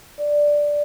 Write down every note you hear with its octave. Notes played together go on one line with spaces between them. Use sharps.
D5
D5